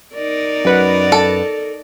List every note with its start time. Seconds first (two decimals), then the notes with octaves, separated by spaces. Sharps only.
0.14 D#4 A#4 D5
0.65 F#2 B4 F#5
1.12 A4